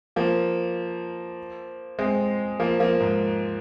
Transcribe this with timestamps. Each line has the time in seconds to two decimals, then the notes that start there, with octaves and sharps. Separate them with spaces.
0.16 F3 A#3
1.99 G#3 C4
2.60 F3 A#3
2.80 F3 A#3
3.00 G#2